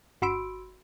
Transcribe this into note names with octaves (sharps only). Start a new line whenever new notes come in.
G1 F#4 B5 C6 E6 D7